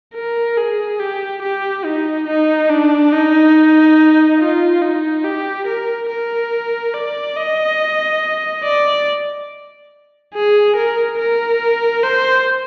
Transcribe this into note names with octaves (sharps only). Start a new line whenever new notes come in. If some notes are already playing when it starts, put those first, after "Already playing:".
A#4
G#4
G4
G4
D#4
D#4
D4
D#4
F4
D#4
G4
A#4
A#4
D5
D#5
D5
G#4
A#4
A#4
C5